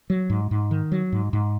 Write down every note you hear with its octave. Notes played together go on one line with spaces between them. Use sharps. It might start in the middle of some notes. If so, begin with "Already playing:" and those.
F#3
G#2
G#2
D#3
F#3
G#2
G#2